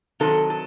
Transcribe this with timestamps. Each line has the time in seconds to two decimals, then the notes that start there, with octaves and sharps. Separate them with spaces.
0.20 C3 D#3 F#3 A4
0.50 A4